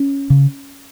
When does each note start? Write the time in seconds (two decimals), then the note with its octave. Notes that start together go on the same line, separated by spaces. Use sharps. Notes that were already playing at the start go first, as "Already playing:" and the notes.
Already playing: C#4
0.30 C#3